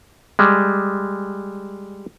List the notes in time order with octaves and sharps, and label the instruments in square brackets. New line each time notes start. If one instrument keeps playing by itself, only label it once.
[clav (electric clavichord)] G3 G#3